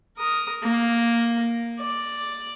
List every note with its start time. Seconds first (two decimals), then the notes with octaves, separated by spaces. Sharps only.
0.18 A#4 D#6
0.63 A#3
1.79 D5